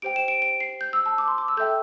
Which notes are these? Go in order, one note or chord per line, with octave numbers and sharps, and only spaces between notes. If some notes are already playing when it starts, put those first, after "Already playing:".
G4 C5 G5 D7
E7
D7
D7
C7
G6
E6
A5
D6
C6
D6
E6
A4 E5 G5 G6